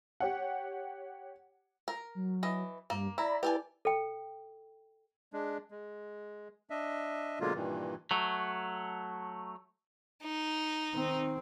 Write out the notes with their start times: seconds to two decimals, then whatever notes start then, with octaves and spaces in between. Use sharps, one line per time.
0.20 G4 C#5 F#5
1.88 A#4
2.15 F#3
2.43 E3 D#5
2.90 G2 A#3
3.18 E4 D5 A#5 B5
3.43 E4 G4 B4 D5 G#5 A5
3.85 A4 G5
5.33 G#3 D4
5.71 G#3
6.70 D4 D#5 E5
7.40 B2 D3 F#3 G#3 A#3 F4
7.55 G2 A#2 D#3 E3
8.11 F#3 A3
10.23 D#4
10.92 D#3 C4